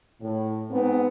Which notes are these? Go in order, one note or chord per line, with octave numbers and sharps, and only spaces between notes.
A2
G#2 B3 C4